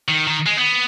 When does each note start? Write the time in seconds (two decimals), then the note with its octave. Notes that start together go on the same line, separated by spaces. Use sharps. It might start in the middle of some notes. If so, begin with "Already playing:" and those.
0.08 D#3
0.27 D#3
0.46 G#3
0.57 B3